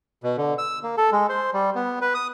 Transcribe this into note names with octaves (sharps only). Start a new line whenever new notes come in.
B2
D3
E6
A#3
A4
G#3
C5
G3
B3
B4
D#6